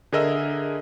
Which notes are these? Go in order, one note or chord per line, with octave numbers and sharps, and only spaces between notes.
D3 G#4 A#4 D#5 E5 E6